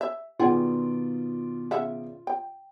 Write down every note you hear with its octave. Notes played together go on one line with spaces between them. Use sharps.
E5
B2 D#3 F4 G#4 D5 F#5 G5
C#3 E5 F#5
G5